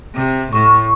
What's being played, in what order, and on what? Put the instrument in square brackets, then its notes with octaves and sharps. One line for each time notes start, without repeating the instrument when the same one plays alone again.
[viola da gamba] C3
[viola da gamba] A2 [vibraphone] C#6